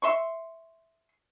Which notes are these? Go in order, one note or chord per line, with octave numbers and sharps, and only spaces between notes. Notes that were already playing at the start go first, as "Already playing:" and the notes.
E5 C6 C#6